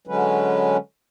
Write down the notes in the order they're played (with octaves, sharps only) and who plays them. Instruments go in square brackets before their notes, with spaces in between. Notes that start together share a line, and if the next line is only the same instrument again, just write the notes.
[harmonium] D3 F#3 G#3 C#4 B4